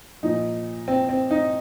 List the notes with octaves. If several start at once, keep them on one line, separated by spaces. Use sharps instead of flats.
A#2 F3 D#4
C4
C4
D#4